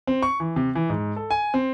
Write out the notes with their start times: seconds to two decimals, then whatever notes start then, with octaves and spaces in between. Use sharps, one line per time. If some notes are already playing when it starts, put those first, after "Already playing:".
0.07 C4
0.23 C#6
0.40 E3
0.56 C3
0.75 E3
0.90 G#2
1.16 A4
1.31 G#5
1.54 C4